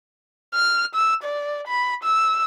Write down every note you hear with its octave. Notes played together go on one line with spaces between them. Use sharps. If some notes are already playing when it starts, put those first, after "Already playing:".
F6
E6
D5
B5
E6